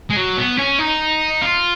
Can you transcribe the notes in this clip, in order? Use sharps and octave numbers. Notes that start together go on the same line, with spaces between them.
G#3
F#3
B3
C#4
D#4
F4